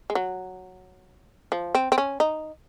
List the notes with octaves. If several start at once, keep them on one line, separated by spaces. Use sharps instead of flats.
G#3
F#3
F3
C4
C4
C#4
D#4